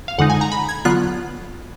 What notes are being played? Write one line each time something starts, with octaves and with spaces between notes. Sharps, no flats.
F5
F2 D3 G#3 D#4 F#5
G#5
A#5
B5
G#6
D3 F#3 B3 F4 F#6